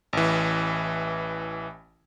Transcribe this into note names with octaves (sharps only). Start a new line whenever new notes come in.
A1 E3